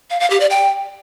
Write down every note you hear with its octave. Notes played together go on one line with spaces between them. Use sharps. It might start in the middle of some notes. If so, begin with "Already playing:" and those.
F5
F5
G4
D5
G5